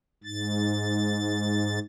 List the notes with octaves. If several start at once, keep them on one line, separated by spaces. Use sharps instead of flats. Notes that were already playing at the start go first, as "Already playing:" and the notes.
G#2 A6